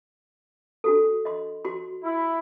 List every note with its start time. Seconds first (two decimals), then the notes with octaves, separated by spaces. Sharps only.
0.84 D4 F#4 A4
1.25 D#5 C6
1.65 F#4 C6
2.03 E4